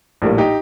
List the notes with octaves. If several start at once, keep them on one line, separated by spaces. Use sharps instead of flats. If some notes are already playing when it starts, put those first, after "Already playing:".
A#1 A2 G3 A#3
D#4 G4